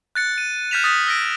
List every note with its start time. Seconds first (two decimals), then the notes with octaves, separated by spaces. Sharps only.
0.15 F#6 A6 C#7
0.38 D#7
0.71 F6 G6 A6 B6 E7 F7
0.84 D#6 A6 B6
1.07 E6 A#6 D7